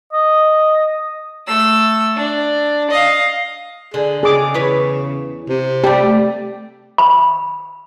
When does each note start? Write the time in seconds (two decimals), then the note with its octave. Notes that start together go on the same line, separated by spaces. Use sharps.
0.13 D#5
1.47 A3 E6
2.16 D4
2.90 D#5 F5
3.94 D3 G#4
4.23 C#3 G#4 D6
4.54 E2 B4 C#5
5.49 C3
5.84 G3 A3 G4
6.98 B5